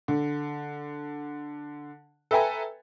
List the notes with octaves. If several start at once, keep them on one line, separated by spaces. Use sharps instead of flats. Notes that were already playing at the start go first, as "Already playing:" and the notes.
D3
A4 B4 E5 G5 G#5 A#5